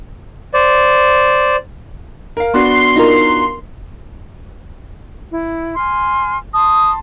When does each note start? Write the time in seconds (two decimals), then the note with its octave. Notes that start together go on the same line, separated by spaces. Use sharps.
0.54 C5 D5
2.37 A#4 F5
2.54 B3 D4 F#4 C6
2.96 D#4 F4 A#4
5.31 E4
5.75 G#5 C6 F6
6.54 A5 C6 D#6